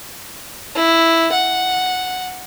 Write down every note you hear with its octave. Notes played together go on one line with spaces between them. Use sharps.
E4
F#5